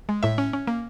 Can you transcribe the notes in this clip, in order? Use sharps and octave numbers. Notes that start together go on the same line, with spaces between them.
G#3
A2 E5
C#4
C#4
A#3